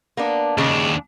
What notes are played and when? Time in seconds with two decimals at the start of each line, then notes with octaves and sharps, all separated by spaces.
0.17 A#3 B3 D4
0.58 D#2 C#3 G#3 D4 G#4